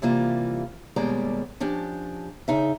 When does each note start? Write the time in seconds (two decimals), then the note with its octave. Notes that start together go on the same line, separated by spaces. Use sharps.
0.02 C3 E3 G3 A#3 F4
0.96 D#2 B2 G3 G#3 D5 A#5
1.60 F3 C#4 D4 G4
2.48 C#3 D#4 E5